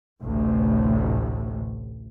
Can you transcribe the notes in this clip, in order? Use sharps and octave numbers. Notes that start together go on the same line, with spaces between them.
A1 D2 A2 C3